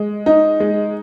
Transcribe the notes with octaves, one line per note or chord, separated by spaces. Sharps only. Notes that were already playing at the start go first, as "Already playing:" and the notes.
Already playing: G#3
D#4
G#3